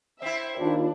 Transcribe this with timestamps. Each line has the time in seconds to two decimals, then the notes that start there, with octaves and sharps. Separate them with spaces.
0.22 C4 E4 E5
0.60 D#2 D4 F4